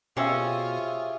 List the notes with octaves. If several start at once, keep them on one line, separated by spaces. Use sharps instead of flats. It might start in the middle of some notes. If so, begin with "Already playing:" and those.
B2 C4 C#4 F4 G4 G#4 D#5 E5